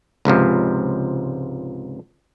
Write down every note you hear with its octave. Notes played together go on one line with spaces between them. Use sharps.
C#2 G#2 C3 F3